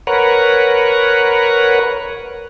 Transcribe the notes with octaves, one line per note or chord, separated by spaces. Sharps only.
A#4 B4 C#5 F#5